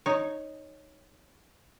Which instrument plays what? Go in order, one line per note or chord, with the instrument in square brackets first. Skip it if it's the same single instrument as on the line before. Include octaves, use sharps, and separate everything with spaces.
[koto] D#4 C#5